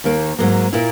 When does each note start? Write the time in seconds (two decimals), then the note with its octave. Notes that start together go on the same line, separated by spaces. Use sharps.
0.04 D#2 D#3 A#3
0.39 G#2 F#3 A#3
0.73 A#2 A#3 E4